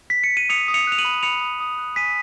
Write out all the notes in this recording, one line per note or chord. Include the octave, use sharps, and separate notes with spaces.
B6
C#7
D#7
D#6 C#7 F7
D#6
C#7 F7
F#6 F7
D#7 F#7
B5
B5 C#7 F7
D#6
D#6
F#6
G#5 B6 D#7